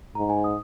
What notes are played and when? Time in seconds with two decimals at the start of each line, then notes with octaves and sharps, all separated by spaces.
0.15 G#2 A#5
0.30 G#5
0.44 D#6